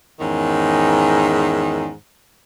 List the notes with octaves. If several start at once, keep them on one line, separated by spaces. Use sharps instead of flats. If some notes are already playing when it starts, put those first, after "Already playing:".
E2 G#2 D#3 C#4